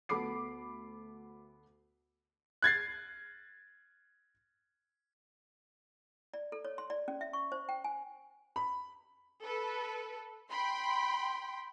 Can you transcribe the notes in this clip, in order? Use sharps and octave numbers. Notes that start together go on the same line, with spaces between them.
D2 B3 A4 B5 D6 C7
F#6 G#6 A6 C7
D5
A4
C#5
C6
D5
C#4
E5
C#6
C5
G5
G#5
B5
A4 B4
G5 B5 C6